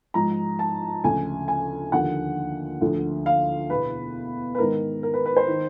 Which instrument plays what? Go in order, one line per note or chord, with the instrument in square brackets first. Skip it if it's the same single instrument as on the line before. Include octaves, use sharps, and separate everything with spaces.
[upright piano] G#2 F3 A#5
A5
D2 C#3 F3 G#5
G#5
D#2 D3 F3 F#5
D2 D3 F3
F5
E2 B2 B4
B4
G#2 D#3 A#4
A#4
B4
B4
C5
D#3